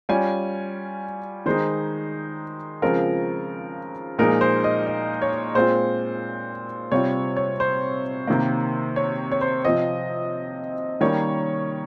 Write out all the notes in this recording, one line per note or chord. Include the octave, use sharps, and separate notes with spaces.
G3 C#4 F4 G#5
D#3 G#3 D#4 C5
C#3 F3 G#3 C4 F4 A#4
A#2 F3 G#3 D#4 A#4
C5
D#5
D#5
C#5
A#2 G#3 C4 F4 C5
C3 G3 C4 F4 C#5
C#5
C5
C3 D#3 A#3
C#5
C#5
C5
C3 F3 C4 F4 D#5
D#3 G3 A#3 C#4 C#5